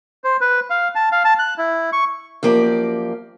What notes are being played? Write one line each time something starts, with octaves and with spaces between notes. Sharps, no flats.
C5
B4
F5
A5
F5
A5
F#6
E4
C#6
F#2 F3 A#3 G4 D5